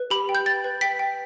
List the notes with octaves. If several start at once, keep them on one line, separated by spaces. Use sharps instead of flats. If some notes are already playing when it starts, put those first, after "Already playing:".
Already playing: B4
G4 B5
G5
G6
G5 A6
B4
G5 B6
G5